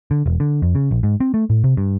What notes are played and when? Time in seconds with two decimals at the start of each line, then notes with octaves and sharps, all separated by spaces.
0.11 D3
0.26 E1
0.40 D3
0.62 F2
0.75 C#3
0.91 A#1
1.03 G#2
1.20 C4
1.34 A3
1.50 A2
1.64 C3
1.77 G2